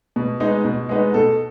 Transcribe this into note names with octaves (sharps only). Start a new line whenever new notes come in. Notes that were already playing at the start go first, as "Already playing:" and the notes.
B2
G#3 B3 D#4
B2
G#3 B3 D#4
B2 A4